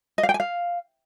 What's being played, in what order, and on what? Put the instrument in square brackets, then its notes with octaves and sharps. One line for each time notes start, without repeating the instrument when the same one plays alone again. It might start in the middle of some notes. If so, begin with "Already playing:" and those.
[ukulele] D#5
F5
G5
G#5
F5